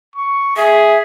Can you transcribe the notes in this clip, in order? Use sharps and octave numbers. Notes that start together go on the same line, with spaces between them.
C#6
G#4 E5